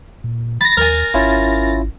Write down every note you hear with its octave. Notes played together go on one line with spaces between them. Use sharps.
A#2
B5 A6 A#6
D#2 A#4 G#5
G#1 C#4 E4 F4